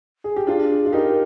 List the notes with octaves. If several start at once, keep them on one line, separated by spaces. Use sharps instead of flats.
G#4
G4
D4 F4 G#4
F4
D#4 G4 A#4